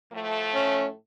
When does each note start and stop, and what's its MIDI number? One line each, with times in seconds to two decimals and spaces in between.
0.13 0.94 45
0.13 0.94 53
0.13 0.94 57
0.55 0.85 61